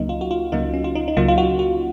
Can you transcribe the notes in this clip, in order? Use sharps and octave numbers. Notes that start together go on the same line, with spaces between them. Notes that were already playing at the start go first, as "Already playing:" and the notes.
Already playing: C#2 C#3 F#3 A#3 D#4
F4
F#4
F4
C#2 C#3 F#3 A#3 D#4
C#4
F4
D#4
D#4
C#2 C#3 F#3 A#3 F4
F4
F#4
F#4